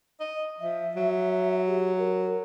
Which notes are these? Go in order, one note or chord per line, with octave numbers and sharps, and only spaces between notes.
D#5
F3 E5
F#3
G4
A#4